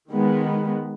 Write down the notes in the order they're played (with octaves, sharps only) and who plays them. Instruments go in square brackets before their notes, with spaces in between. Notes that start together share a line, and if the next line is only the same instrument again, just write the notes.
[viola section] D#3 G#3 B3